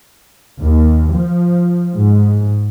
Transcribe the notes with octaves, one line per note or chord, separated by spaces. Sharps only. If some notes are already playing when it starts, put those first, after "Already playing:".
D#2
F3
G#2